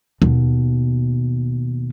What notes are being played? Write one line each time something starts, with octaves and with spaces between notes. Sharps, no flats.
D#2 B2